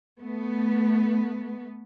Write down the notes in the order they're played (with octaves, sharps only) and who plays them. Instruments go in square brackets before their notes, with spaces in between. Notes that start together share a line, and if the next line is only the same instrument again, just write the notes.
[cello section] A3 B3